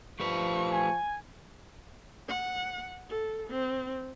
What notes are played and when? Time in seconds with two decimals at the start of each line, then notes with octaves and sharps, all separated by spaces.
0.20 F3 A3 G4 B4 C#6
0.71 G#5
2.29 F#5
3.09 A4
3.50 C4